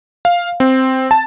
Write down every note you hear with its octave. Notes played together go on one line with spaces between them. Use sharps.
F5
C4
A5